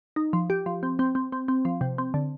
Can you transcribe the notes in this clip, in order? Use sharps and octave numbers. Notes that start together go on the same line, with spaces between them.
D#4
F3
G4
F3
C4
C4
C4
C4
C4
F3
C3
C4
D3